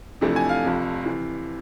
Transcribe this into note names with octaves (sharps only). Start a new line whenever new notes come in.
F2 C3 E3 A3 D4
G#5
F5
F1 F2 C3
C3 E3